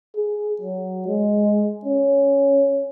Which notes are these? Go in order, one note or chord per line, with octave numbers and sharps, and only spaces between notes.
G#4
F#3
G#3
C#4